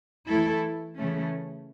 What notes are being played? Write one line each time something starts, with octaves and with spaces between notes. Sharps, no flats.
E3 A3 E4 A4
C#3 E3 A3 C#4